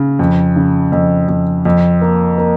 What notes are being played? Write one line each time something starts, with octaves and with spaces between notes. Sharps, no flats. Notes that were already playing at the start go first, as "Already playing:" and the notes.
Already playing: C#3
F2
C#3
F2
F2
F2
A#3
A#3